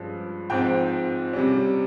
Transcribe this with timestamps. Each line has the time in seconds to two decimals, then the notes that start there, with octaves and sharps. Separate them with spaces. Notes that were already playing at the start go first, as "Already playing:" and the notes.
Already playing: G2 F3 G#3 C#4
0.50 G#2 F3 C4 G5
1.33 C3 G3 C#4